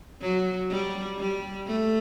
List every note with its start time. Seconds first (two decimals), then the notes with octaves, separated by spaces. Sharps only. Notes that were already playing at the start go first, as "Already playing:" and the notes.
0.22 F#3
0.71 G3
1.19 G3
1.67 A3